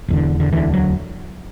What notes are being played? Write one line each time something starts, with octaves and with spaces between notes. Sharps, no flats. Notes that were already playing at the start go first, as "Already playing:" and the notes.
E1 E2 D3
D3
E1 D2 D3 E3
F#3